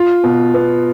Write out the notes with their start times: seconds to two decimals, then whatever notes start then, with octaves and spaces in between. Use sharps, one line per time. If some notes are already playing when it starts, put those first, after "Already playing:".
Already playing: F4
0.24 B2
0.54 B3